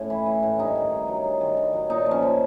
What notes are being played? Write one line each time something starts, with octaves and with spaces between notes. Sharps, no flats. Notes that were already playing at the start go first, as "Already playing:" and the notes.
Already playing: A2 C#4
E3
E3
A2
G2 D#4
D#3
G2
F#3
G2
D#3
G2
F#3
A#2 D#4
F3
C#4
F3